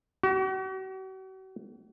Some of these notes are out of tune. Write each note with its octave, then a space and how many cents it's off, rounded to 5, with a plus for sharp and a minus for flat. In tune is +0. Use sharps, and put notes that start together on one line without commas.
F#4 +45